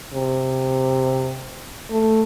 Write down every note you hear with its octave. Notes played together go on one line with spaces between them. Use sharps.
C3
A3